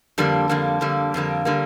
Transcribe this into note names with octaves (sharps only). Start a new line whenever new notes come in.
F2 D3 G3 A#3
F2 D3 G3 A#3
F2 D3 G3 A#3
F2 D3 G3 A#3
D3 G3 A#3